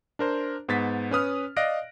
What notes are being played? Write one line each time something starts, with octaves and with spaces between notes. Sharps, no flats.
D4 A#4 C5
G#2 B3 A6 B6
C#4 B4 D#6 F6
D5 D#5 F5 F#6 A#6 D7